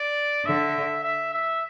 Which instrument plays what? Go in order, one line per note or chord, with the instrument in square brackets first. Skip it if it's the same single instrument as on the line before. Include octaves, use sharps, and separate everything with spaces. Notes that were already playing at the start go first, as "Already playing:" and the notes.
Already playing: [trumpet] D5
[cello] D3 [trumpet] E5
[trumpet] E5
E5